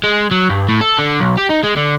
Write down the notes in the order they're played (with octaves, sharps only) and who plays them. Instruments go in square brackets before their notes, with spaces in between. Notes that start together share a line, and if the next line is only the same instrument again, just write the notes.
[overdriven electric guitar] G#3
F#3
G2
A2
A4
D3
B1
G4
D#4
G#3
D3